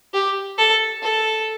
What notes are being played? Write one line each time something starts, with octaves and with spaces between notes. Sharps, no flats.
G4
A4
A4